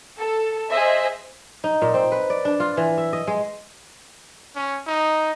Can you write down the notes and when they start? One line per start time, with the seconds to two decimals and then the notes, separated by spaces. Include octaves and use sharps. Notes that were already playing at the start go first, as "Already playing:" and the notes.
0.18 A4
0.70 G#4 C5 D#5 E5
1.64 D#4
1.82 A#2
1.94 C4
2.12 B4
2.30 D5
2.45 D4
2.60 F4
2.77 E3
2.98 E5
3.13 D#5
3.27 G#3
4.56 C#4
4.87 D#4